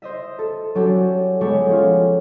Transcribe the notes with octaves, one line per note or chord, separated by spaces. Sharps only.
C5 D#5 E5
A4
F#3 C#4 D4 F#4 G4 A4
G#3 B3 G4 A4 C#5 F#5
F3 C#4 F4